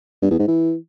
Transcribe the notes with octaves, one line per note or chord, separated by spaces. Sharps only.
G2
E2
G#2
E3